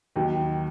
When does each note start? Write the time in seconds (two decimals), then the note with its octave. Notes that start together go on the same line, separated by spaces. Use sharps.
0.16 D#2 D#3 F#3